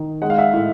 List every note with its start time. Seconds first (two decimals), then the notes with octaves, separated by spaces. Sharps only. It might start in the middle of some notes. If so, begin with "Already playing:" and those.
Already playing: D#3
0.22 G#3 F#5
0.30 F5
0.38 E5 F#5
0.53 A2